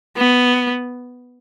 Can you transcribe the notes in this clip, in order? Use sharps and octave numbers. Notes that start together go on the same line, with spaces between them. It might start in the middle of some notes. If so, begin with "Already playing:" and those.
B3